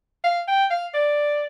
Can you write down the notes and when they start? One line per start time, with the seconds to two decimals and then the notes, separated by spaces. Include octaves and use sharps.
0.24 F5
0.48 G5
0.71 F5
0.94 D5